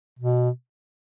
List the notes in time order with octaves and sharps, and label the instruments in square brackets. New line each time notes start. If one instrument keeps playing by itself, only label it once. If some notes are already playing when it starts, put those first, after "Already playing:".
[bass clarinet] B2